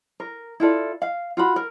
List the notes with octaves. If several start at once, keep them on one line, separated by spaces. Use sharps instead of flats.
A#4
E4 F4 A4 D5
F5
F4 F#4 B5
A#4